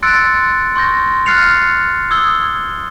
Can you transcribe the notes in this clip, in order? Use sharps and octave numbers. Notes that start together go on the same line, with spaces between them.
C6 E6 F#6 A6 C#7 D7
C6 C#6 G6 A#6
F6 F#6 A6 C7 C#7 F7
D#6 E6 G#6 G7